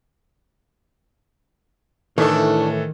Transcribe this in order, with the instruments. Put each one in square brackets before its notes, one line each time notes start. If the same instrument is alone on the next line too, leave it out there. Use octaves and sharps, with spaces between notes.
[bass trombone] A2 [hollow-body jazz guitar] D#3 [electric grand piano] E3 A4 [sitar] A3 D4